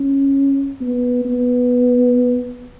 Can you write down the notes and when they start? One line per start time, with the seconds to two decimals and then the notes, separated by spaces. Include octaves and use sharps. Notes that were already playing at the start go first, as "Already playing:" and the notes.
Already playing: C#4
0.81 B3
1.25 B3